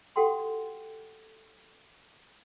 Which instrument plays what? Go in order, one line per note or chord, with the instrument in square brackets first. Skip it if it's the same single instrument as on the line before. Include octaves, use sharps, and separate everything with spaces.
[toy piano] F#4 G4 A4 F#5 G5 C6